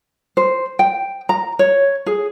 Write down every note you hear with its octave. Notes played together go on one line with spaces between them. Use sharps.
C5
G5
A#5
C#5
G#4